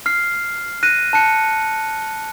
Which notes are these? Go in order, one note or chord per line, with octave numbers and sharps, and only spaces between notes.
F6 C7
F#6 A#6 D#7
A5 F#6 C#7